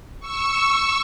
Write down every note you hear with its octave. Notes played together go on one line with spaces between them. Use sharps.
C#6 E6